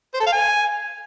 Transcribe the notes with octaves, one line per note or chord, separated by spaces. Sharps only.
C5
A4
F5
G#5